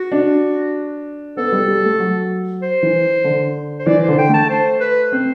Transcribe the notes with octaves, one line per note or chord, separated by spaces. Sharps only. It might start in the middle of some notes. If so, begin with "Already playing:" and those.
Already playing: F#4
D4
B3 A4
G3
G3
A3
F#3
C5
E3
D3
C5
E3 D5
C5
D3
G5
A3
A5
C5
B4
C4 C5